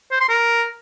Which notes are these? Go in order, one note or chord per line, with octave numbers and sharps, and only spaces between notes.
C5
C6
A#4